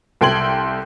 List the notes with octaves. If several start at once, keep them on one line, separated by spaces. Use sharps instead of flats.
C2 A4 G5 C6 G#6 F#7